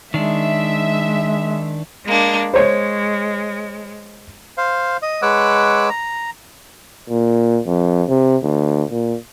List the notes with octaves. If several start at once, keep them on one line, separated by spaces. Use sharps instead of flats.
D#3 G#3 D4 E5
G#3 A#3 D4
G#3 C5 C#5
C5 F5
D#5
G#3 B4 C#5 F#5 D6 E6
A#5
A#2
F2
C3
D2
A#2